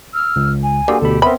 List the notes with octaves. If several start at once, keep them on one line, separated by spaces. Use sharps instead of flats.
E6 F6
C#2
G#5
D3 G3 A#3 F#4 G#4
D2 B2 G4 A4 B5
B3 C4 A#4 E5 B5 C6